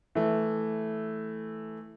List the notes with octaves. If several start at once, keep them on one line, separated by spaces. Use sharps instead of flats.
E3 A3